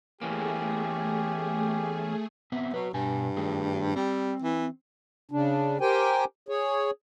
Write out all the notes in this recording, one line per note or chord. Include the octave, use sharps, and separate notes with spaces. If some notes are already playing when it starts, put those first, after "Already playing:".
E2 E3 A3 A#3 C#4 G4 G#4
B3 C4 E5
F#3 F#4 B4
G2 B2 G#5
D#3 A3 G#4
G3 C4
E3
C#3 D4
G4 A#4 C5 G5 G#5
G#4 C#5